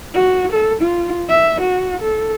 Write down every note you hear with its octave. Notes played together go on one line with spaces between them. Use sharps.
F#4
A4
F4
E5
F#4
A4